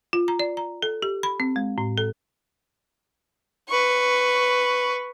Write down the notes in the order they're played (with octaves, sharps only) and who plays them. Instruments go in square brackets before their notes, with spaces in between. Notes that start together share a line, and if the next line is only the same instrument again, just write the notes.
[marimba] F4
A#5
D5
A#5
A4
G4
B5
C4
G#3
A2
A4
[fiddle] B4 C#6